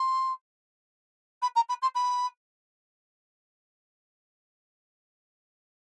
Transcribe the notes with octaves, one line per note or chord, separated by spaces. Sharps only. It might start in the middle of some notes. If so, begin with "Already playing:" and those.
Already playing: C6
B5
A#5
B5
C6
B5